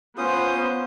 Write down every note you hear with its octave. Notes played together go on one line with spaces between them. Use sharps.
B3 C#4 F4 C5 D#6